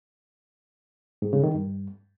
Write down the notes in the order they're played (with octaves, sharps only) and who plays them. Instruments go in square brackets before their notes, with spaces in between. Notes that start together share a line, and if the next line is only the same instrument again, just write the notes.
[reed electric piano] G#2
C#3
D#3
G2